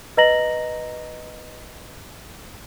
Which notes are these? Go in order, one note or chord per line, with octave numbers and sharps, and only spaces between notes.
B4 D#5 A#5 A#6 F#7